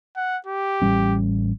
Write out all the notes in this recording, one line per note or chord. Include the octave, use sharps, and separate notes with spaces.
F#5
G4
A1 G3 C#4